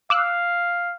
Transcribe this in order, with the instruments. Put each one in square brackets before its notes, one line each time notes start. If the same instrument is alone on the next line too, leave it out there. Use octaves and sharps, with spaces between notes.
[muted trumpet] F5 [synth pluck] D6 E6 F#6